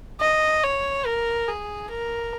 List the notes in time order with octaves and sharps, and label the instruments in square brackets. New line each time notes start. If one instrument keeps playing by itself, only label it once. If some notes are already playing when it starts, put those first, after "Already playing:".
[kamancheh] D#5
C#5
A#4
G#4
A#4